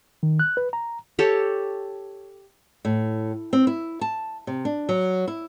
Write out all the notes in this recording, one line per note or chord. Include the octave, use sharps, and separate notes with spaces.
D#3
F#6
B4
A#5
G4 A4 C#5 A5
A2
C4
E4
A5
C3
D4
F#3
E4